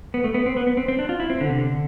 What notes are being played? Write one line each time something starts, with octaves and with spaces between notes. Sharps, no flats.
B3
A3
B3
C4
B3
B3
C4
C4
D4
F4
E4
C4
D3
C3
D3